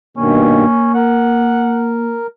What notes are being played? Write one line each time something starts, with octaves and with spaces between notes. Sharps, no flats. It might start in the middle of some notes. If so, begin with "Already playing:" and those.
G2 B2 D#3 A#3 C#4
A#4 F#5